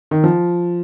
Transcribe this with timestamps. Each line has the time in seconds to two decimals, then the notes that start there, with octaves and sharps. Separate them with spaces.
0.11 D#3
0.24 F3